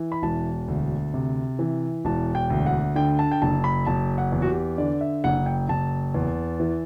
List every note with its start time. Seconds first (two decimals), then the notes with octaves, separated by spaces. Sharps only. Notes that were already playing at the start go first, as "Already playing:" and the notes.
Already playing: E3
0.12 B5
0.23 E1 A5
0.68 D2
1.14 C3
1.59 E3
2.05 E1 A5
2.35 G5
2.50 D2
2.66 F#5
2.96 D3 G5
3.19 A5
3.32 G5
3.42 F#1 A5
3.64 B5
3.87 F#1 A5
4.18 F#5
4.32 E2
4.42 F#4
4.48 G4
4.78 D3 D5
5.01 E5
5.24 F#1 F#5
5.46 G5
5.69 F#1 A5
6.14 E2
6.60 E3